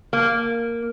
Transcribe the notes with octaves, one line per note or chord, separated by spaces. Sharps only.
A#3